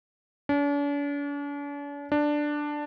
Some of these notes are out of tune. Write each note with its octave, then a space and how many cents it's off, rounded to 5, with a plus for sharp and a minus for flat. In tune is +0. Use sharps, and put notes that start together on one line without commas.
D4 -45
D4 +5